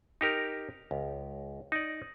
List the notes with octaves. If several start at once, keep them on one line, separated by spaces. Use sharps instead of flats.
D#4 G4 A#4
C#2
D#4 D5